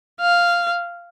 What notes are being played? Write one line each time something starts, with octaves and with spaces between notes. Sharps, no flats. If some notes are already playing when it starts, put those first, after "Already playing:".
F5